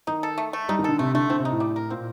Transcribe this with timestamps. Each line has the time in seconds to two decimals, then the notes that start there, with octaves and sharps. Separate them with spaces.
0.07 D#3 D#4
0.23 A4
0.38 A3
0.53 A3
0.68 G3 D#4
0.79 D#3
0.84 D3 A4
0.99 C3 A3
1.14 D3 A3
1.30 D3 C4
1.40 C3
1.45 D#4
1.51 A2
1.60 G3
1.76 A#4
1.90 A#2 C4